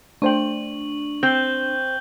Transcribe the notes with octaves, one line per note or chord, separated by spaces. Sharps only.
A3 D4 C5 G5 C#6 F#7
C4 G5 G6 G7